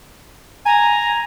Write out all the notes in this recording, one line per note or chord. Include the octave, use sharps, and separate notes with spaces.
G#5 A#5